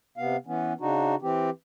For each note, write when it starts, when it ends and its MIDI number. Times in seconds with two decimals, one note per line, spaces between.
0.18 0.37 48
0.18 0.37 59
0.18 0.37 77
0.46 0.73 52
0.46 0.73 59
0.46 0.73 61
0.81 1.15 49
0.81 1.15 62
0.81 1.15 63
0.81 1.15 66
1.22 1.50 52
1.22 1.50 60
1.22 1.50 67